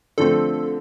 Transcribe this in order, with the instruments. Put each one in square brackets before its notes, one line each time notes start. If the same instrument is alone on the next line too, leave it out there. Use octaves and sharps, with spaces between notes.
[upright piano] D3 F3 A3 C4 [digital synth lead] A4